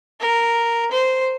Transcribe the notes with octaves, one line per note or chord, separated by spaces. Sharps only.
A#4
C5